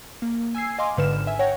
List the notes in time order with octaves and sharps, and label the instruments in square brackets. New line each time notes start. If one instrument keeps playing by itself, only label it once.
[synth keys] A#3
G#5 E6 G#6 C7
D#5 F5 G#5 C6 D6
G#1 G#2 D3 B4 F6 E7
E5 G#5
C#5 F#5 G5 A5 A#6